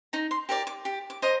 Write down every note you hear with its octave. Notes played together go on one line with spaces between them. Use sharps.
D#4 A#5
C6
G4 A#4 D5
D6
G4
D6
C5 D#5 A#5